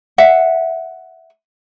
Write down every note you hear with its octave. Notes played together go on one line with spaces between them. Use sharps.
E5 F#5